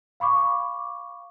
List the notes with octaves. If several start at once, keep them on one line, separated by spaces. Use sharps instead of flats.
F5 B5 C#6 D6